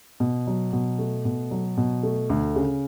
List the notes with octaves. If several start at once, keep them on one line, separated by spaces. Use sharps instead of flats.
B2
F#3
B2
A3
B2
F#3
B2
A3
D2
C#3